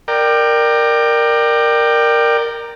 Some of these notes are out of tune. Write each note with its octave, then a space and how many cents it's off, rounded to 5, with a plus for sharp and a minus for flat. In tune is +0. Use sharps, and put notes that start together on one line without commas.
A#4 +0 D5 +25 G5 +0